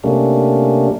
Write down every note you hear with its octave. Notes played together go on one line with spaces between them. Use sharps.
C3 G3 A3 A#3 C#4 D4